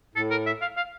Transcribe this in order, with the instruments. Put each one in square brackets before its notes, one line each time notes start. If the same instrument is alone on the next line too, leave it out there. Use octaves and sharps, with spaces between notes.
[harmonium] A2 [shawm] A4
[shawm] A#4
E5
F5
F5